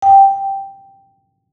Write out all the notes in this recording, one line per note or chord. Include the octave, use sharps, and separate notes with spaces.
G5